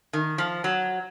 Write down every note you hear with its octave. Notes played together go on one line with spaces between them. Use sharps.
D#3
F3
F#3